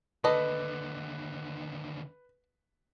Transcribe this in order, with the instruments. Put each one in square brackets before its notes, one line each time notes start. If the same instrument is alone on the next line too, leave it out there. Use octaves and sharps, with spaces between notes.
[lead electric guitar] D#2 D3 [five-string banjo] A4 D#5 [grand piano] B4